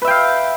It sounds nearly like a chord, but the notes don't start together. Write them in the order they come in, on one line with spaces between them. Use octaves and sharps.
B4 E5 G5 F5